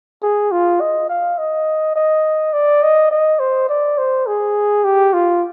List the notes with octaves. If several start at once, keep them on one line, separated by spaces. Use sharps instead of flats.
G#4
F4
D#5
F5
D#5
D#5
D5
D#5
D#5
C5
D5
C5
G#4
G4
F4